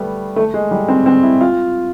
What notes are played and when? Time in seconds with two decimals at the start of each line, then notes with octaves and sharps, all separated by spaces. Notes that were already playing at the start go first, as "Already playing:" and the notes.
Already playing: G3 A3 B3
0.36 A3
0.54 G#3
0.71 G3
0.88 C4
1.06 C4
1.23 E4
1.41 F4